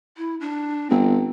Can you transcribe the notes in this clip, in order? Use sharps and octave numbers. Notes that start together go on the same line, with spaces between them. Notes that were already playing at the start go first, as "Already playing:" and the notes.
E4
D4
G1 C4